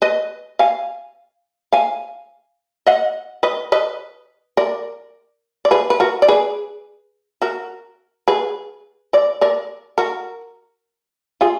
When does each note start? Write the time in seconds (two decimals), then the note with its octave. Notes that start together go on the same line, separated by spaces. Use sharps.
0.02 B4 D#5
0.59 F5 G#5
1.72 F5 G#5
2.87 D#5 F#5
3.43 B4 D#5
3.72 B4 D#5
4.57 A#4 D5
5.65 D5
5.71 G#4 B4
5.90 B4
6.00 F#4 A#4
6.22 D5
6.28 G#4 B4
7.42 F#4 A#4
8.28 G#4 B4
9.13 A#4 D5
9.41 A#4 D5
9.98 F#4 A#4
11.41 F4 G#4